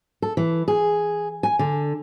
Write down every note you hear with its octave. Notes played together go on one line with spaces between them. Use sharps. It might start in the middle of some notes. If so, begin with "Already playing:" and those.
A4
E3
G#4
G#5
D3